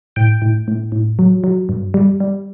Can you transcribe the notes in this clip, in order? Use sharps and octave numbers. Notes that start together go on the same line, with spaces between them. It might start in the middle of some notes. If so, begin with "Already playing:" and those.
A2 G5
A2
A2
A2
F#3
F#3
G2
G3
G3